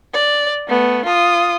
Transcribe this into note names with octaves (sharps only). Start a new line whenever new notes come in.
D5
A3 B3
F4 D#6